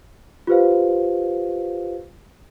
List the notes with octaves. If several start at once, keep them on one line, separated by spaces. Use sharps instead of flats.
F4 G4 B4 C5 F5